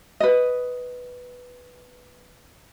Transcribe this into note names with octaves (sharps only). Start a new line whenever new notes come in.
B4 D#5